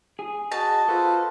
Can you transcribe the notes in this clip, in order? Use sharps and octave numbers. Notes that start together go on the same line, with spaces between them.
G#4
F#4 D#5 A5
F4 A4 B4 C5